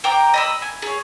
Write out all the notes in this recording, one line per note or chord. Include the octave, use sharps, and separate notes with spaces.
C5 G5 A#5 D6
D#5 B5 E6
G#5
G#4 C#5